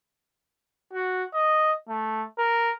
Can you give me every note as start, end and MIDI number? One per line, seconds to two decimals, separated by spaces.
0.93 1.24 66
1.34 1.73 75
1.89 2.24 57
2.38 2.73 70